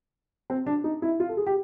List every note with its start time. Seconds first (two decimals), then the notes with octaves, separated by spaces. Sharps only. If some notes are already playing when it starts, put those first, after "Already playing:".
0.50 C4
0.66 D4
0.84 D#4
1.02 E4
1.20 F4
1.29 A4
1.37 G#4
1.47 G4